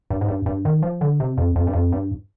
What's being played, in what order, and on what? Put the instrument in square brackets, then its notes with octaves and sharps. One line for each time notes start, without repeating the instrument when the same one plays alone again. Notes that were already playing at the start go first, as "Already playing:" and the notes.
[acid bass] G2
G#2
G2
G2
D#3
F3
D3
C3
F2
F2
G2
F2
G2